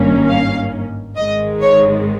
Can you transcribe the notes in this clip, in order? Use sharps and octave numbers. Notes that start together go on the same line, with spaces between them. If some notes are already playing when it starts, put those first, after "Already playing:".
Already playing: G#1 G2 D#3 A#3 C#4
F5
G#1 G#2 D#3 G#3 D#5
C#5